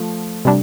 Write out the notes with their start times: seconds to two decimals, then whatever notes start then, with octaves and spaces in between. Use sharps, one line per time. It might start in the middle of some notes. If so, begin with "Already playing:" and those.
Already playing: F3 A3
0.45 C3 G3 D4